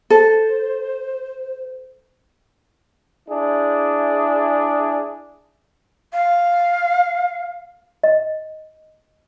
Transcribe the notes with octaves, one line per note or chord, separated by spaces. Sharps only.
A4 C5
D4 E4 G#4
F5
D#5